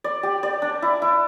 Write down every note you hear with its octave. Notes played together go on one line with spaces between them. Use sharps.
D5
G4
D5
D4
E4
E4